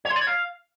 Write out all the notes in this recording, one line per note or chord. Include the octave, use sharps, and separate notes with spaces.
C#5
C6
D5
C#5
F5